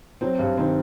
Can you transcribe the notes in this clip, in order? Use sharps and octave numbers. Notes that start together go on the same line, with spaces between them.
F#3 C4
G2
D#3 C4